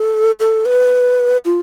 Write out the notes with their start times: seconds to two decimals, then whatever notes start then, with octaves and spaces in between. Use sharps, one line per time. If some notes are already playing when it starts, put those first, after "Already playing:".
Already playing: A4
0.40 A4
0.65 B4
1.45 F4